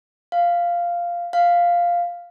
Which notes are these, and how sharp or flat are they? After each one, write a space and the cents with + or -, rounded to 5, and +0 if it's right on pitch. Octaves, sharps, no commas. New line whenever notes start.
F5 -5
F5 +0